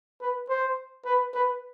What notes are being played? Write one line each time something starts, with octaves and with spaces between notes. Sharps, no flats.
B4
C5
B4
B4